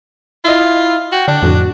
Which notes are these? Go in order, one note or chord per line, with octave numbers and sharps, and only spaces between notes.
E4 F4 D#5 E5
F#4 G5
D3 D4
F2 A2 D3 F#4